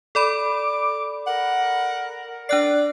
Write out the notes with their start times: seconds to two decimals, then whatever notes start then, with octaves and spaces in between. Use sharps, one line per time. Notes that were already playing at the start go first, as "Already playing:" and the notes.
0.15 A4 D5 B5 D6
1.27 A#4 F#5
2.49 D4 D5 F#6 C7